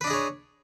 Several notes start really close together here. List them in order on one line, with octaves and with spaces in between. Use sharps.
B4 D4 D#5 G#4 C#5